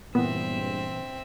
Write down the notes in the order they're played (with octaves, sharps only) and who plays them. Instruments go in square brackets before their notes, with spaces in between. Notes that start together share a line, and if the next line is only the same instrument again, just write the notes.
[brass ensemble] C#2 G2 [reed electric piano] A#2 E3 [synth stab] B3 [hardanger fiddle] C4 E5